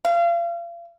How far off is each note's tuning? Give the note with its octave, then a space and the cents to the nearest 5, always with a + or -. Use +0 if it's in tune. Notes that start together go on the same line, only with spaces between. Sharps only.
F5 -35